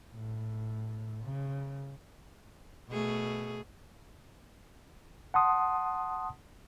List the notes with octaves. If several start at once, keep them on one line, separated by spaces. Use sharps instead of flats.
A2
C#3
B2 A3 G#4
F#5 A5 C6 D#6